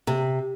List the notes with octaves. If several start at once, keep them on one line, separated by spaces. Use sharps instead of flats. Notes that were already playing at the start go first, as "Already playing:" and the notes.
C3